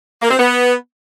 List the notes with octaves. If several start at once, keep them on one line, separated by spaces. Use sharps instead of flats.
A#3
C4
B3